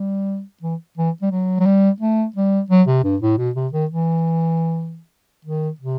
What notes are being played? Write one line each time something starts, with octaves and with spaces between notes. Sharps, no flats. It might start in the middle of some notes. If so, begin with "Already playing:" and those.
Already playing: G3
E3
E3
G3
F#3
F#3
G3
A3
G3
F#3
C3
G2
A2
B2
C3
D#3
E3
D#3
C3